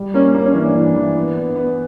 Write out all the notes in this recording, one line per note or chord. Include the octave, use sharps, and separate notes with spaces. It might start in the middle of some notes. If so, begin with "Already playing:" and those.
Already playing: G3
A#3 C#4
A#3 D4
C#4
E3 D4
E3
E3
B3
B3
B3